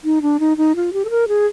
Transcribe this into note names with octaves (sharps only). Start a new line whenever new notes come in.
D#4
D4
D#4
D#4
F4
G4
A4
A#4
G#4